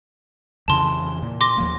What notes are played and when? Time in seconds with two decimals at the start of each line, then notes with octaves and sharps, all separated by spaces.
0.68 F2 C#3 E3 A5 C6
1.22 A#2
1.41 C6 D6 A#6
1.58 D#2 F3 A#3